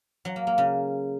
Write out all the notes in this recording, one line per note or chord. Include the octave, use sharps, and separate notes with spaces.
F#3
A#3
A#3
C#3